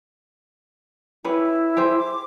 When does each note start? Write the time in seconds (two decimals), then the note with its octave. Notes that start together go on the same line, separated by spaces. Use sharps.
1.24 C#4 E4 G4 B4
1.77 G4 G#4 C5
1.98 D6